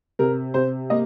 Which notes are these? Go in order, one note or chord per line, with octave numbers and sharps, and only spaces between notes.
C3 A#4
C3 C5
A#3 D#5